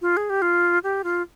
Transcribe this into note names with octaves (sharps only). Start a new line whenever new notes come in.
F4
G#4
G4
F4
G4
F4